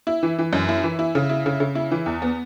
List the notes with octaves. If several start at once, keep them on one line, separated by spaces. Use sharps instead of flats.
E4
E3
E3
F#2
E4
E3
E4
C#3
E4
C#3
C#3
E4
E3
E2
B3